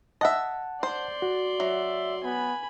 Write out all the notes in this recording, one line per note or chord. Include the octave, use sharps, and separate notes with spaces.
D#5 E5 F#5 A5
C5 D5 C6
F#4
F#3 E5
B3 G#5 B5